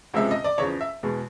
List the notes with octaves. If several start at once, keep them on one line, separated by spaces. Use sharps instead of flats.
C#2 C3 F3 G#3 E5
D#5
D5
E2 C#3 F3 C#5
E5
E2 B2 G#3